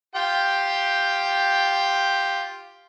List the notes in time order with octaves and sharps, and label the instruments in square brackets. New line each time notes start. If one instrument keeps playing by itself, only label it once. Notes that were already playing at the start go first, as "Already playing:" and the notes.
[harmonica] F4 G4 G5